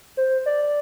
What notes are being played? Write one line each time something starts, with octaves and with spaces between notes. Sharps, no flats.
C5
D5